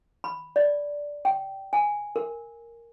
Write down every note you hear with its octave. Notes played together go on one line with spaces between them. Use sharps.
B5
D5
G5
G#5
A#4